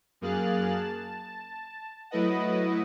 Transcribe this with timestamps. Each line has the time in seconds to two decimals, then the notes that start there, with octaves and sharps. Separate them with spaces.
0.21 F#2 A#3 G#4 F6 F#6 A6
0.73 A5
2.11 F#3 A3 E4 B4 D#5 F#5